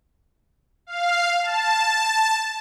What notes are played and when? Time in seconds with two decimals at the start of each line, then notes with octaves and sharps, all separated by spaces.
0.87 F5
1.42 A5